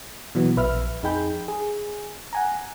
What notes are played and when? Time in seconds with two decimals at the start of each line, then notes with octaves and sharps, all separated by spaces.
0.35 B2 E3 F#3 B3
0.57 A#1 B4 E5 F6
1.03 F2 D#4 G#4 G5 B5 G6
1.48 G#4
2.33 F#5 G#5 A#5